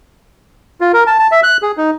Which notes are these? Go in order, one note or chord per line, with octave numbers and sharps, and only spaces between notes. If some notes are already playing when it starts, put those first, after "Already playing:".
F4
A#4
A5
A5
E5
F#6
G#4
D#4